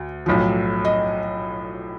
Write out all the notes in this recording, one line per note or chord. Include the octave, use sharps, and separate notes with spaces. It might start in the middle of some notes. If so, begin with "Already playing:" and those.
Already playing: D2
B1 A2 F3
D#5